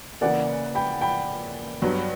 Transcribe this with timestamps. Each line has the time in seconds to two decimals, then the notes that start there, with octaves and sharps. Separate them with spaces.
0.21 C#3 E3 A#3 D5 F#5
0.75 G5 B5
1.01 G5 B5
1.82 G2 F#3 B3